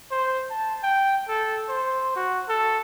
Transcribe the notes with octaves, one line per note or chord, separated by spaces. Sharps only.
C5
A5
G5
A4
C5
F#4
A4